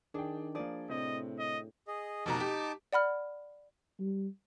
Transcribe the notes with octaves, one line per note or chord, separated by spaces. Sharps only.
D#3 D4 G#4 G5
F3 A#3 G#4 D5
A2 C3 C4 D#5
D#5
G#4 D#5
F1 B2 D#4 A5 A#5 D6
G4
D5 F#5 B5 F6
G3